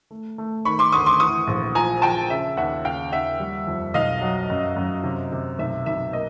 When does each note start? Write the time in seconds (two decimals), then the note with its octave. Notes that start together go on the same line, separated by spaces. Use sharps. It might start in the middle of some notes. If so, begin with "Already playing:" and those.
0.11 A3
0.38 A3
0.65 D#3 B5 C#6
0.79 C6 D6
0.92 D2 C#6 D#6
1.06 C6 D6
1.20 E3 C#6 D#6
1.47 A#1
1.75 F3 G#5 A#5
2.02 F3 G5 A5
2.30 C#3 E5
2.57 D#2 E5 F#5
2.85 C#3 F5 G5
3.12 D#2 E5 F#5
3.40 G3
3.67 F2
3.94 B1 D#5 F5
4.21 F#3
4.50 F#2
4.76 F#2
5.03 C3
5.32 C3
5.59 B1 E5
5.86 B1 E5
6.13 A#3 D#5